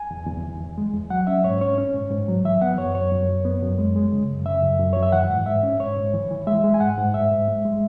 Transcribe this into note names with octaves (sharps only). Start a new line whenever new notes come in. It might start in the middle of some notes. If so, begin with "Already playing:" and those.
Already playing: G#5
E2
E2
E2
E2
G#3
E2
F#3 F#5
C#4 E5
G#2 C#5
C#4 C#5
C#4
G#2
G#2
F#3
E3 E5
B3 F#5
F#2 C#5
F#2 C#5
F#2
F#2
B3
F#2
G#3
G#3
C#3
F#2
C#3 E5
F#2
F#2
F#2 C#5
E5
E3 F#5
G#2
G#2 E5
C#4
G#2 C#5
G#2
E3
E3
G#3 E5
G#3
G#5
G#2 F#5
G#2
G#2 E5
G#2
G#3
G#3